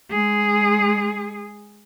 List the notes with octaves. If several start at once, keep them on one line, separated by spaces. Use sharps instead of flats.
G#3 G#4